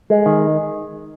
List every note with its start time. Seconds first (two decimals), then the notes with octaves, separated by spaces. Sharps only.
0.10 G#3
0.26 D#3